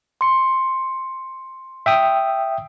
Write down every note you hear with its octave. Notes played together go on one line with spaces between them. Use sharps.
C6 C#7
E5 G5 D#6